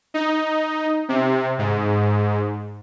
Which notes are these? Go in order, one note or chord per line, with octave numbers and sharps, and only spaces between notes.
D#4
C3
G#2